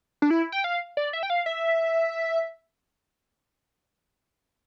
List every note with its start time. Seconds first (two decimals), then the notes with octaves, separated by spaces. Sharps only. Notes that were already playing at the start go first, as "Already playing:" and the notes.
0.22 D4
0.31 E4
0.52 G5
0.64 F5
0.97 D5
1.13 E5
1.23 G5
1.30 F5
1.46 E5